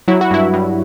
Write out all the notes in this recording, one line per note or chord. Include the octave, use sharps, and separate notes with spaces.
F#3 E4
F#4
G2 E4
G2